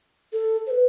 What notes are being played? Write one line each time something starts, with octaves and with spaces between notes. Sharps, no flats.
A4
C5
B4